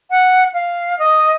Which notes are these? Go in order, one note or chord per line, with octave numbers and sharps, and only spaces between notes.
F#5
F5
D#5